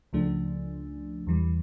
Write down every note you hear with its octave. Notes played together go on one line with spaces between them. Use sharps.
C#2 C#3 F3 A3 D4
E2 E3 G3